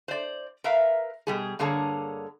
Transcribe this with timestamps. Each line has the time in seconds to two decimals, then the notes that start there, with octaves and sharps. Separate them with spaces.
0.08 C5 D5
0.64 A#4 B4 E5 F5 A#5
1.27 B2 G3 G#4
1.59 G2 D3 A#3 G#4 C#5 A5